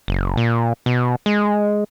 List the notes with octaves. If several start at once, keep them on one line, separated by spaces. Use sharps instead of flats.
F#1
A#2
B2
G#3